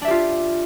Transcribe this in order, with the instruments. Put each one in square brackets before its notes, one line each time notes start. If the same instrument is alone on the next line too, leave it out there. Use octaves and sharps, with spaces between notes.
[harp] D4
E5
G4
F4